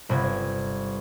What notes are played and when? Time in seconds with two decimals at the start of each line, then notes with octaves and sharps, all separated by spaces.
0.09 G1 C3 G#6